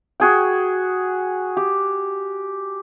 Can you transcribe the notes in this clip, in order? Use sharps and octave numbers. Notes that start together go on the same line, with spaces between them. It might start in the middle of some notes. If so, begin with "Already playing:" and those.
F#4 G#4 G5
G4